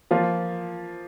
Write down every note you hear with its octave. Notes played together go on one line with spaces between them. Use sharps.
F3 A#3 F4